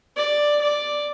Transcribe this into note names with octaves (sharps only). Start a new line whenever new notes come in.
D5
D5